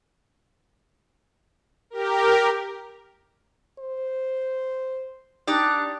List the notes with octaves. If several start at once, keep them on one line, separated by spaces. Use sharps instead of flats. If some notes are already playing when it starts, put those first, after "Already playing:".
G4 A#4
C5
D4 D#4 G4 D5 F#6